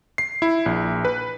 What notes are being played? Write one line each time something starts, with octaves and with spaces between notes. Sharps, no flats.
C7
E4
A#1
B4